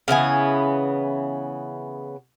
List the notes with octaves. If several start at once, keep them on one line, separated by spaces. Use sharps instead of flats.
C#3 E3 B3 G#5